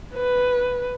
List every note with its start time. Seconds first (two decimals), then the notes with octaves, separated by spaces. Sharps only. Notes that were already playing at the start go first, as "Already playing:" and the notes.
0.14 B4